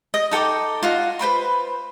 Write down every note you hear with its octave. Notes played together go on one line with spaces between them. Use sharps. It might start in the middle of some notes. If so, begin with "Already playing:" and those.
D#5
D#4 A4 G5 D6
F4 F#4 D#5
B4 C5 B5 C6